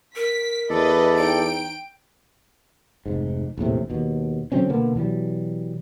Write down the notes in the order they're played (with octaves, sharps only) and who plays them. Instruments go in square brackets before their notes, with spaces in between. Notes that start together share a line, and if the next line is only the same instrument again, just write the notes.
[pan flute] A#4 [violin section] B6
[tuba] E2 [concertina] A4 D5 [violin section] B4 D#5
[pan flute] D#4 [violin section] G5 D7
[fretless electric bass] F1 G#2
A#1 E2 A2 C3
D#2 B2
D3 F#3 C4 C#4
B2 D3 A#3 B3
B2 E3 F#3 G3